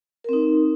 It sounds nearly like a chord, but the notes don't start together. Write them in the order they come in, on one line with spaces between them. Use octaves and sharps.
A#4 C4 D#4